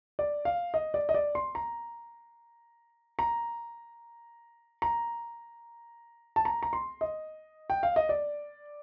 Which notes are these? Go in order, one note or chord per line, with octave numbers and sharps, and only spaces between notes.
D5
F5
D#5
D5
D#5
D5
C6
A#5
A#5
A#5
A5
A#5
A#5
C6
D#5
G5
F5
D#5
D5